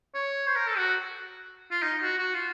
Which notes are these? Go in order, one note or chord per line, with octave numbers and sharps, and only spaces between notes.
C#5
C5
A#4
A4
F#4
F4
D#4
F#4
F#4
F4